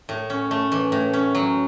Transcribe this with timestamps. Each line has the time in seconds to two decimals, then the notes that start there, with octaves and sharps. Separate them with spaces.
0.09 A2
0.30 C#4
0.51 A3
0.72 E3
0.92 A2
1.13 C#4
1.35 F#3